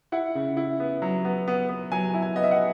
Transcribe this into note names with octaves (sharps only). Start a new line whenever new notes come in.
E4 F#5
C#3
E4
B3
F#3
B3
B3
B3
F#3 G#5
E4
G#5
B3 D#5
E5
F#5